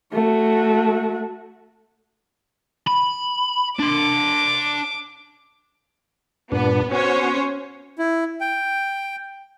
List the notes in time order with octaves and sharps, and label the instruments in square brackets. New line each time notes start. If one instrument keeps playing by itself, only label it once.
[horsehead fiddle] A3 F#4
[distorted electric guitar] B5
[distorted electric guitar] D4 C6 [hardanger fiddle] D6
[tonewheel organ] G2 A#2 D4 [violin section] B3
[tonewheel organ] B3 F#4 [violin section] C#4 C5 C#5
[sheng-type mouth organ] E4
G5